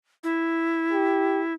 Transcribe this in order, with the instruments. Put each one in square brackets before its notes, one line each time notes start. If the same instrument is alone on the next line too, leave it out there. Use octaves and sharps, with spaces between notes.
[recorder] E4
[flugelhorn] G4